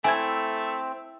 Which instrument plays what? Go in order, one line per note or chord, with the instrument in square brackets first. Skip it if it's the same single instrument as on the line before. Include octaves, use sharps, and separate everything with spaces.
[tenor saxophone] A3 [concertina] C4 [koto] E4 [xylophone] G#5 G#6